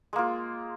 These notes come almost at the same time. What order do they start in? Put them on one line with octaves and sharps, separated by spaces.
G#3 A#3 F4